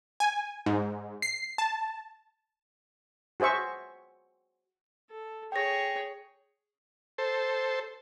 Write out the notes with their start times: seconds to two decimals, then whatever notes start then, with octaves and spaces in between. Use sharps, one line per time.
0.20 G#5
0.66 G#2
1.22 C7
1.58 A5
3.40 F#4 G#4 C5 E5 C#6
5.11 A4
5.52 G#4 C#5 G5 A#6
7.18 A4 C5